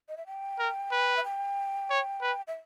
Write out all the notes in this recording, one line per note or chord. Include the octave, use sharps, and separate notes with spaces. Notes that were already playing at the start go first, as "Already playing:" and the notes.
D#5
E5
G5
A#4
B4
E5
G5
C#5
B4
E5